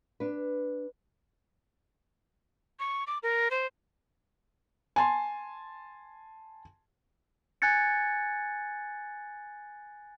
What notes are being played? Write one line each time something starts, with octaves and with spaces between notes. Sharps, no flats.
D4 B4
C#6
D6
A#4
C5
G#5 A5 C6
G#5 F#6 G#6 A6 C#7